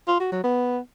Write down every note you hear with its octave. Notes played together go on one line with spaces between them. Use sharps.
F4
F#4
F#3
B3